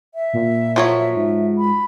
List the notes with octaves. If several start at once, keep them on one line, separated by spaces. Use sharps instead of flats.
E5
A#2
F3 F#3 F4 C#5
G#2
B5